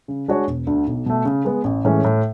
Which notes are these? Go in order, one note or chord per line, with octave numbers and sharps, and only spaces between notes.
C#3
G#3 D4 F#4 C#5
E1
D2 D3
B1
B2 A3
C#3
G#3 B3
A1
A2 E3 G#3 C#4
A2